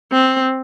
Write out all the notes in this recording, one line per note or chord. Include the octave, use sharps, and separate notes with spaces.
C4